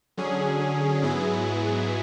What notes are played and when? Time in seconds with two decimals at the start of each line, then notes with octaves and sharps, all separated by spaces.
0.17 D3 F#3 C#4 G#4
1.02 G#2 F#3 B3 E4 G#4